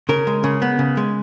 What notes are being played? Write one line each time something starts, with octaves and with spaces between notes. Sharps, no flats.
C#3 A#4
G#3
C#3
B3
C#3
G#3